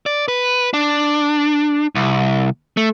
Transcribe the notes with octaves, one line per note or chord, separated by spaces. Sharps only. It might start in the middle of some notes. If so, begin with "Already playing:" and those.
D5
B4
D4
C2
A3